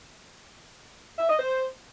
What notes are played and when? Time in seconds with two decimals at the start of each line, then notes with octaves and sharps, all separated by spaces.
1.18 E5
1.28 D#5
1.38 C5